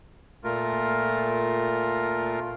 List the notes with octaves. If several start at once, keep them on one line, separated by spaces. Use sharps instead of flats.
A#2 A3 F4 A#4